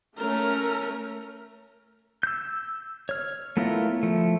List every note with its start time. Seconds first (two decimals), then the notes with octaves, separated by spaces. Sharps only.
0.18 A3 C#4 A#4
2.23 E6 G6
3.09 C#5 F6
3.57 A3 B3 E4 F4 A#4
4.03 F3 A3